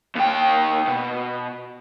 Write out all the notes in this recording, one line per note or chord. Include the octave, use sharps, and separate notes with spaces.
D#2 G5
B2